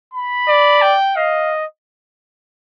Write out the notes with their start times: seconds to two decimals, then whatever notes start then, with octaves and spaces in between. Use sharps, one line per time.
0.13 B5
0.48 D5
0.81 G5
1.16 D#5 F5